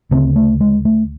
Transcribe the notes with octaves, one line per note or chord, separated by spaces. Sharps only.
D2 C#3 C4
A3
G#3
A3